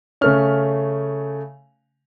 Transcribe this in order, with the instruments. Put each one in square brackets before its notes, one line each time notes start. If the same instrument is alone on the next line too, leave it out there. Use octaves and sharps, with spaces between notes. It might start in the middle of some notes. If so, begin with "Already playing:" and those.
[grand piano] C#3 A3 C#4 F6